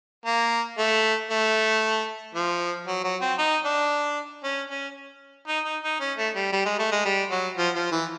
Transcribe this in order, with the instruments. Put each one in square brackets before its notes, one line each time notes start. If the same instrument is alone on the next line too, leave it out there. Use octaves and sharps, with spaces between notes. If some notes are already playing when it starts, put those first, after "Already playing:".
[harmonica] A#3
A3
A3
F3
F#3
F#3
C4
D#4
D4
C#4
C#4
D#4
D#4
D#4
C#4
A3
G3
G3
G#3
A3
G#3
G3
F#3
F3
F3
E3